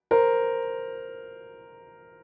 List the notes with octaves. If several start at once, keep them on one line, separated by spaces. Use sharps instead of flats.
A#4 C5